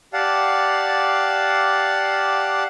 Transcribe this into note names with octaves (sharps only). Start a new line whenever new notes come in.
G4 D5 F5 F#5 A5